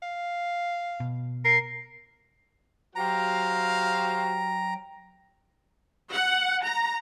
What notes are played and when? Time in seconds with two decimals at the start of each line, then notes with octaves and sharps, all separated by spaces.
0.03 F5
1.00 B2
1.45 A#4 C7
2.96 F#3 F#4 G4 C5 F5 G5 A#5
6.12 F#5
6.64 A#5